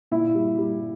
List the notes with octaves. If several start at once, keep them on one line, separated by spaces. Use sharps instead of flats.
A#2 E4
G3
G3